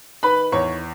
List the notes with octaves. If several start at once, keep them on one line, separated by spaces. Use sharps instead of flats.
D#3 B4 B5
E2 C#5 C#6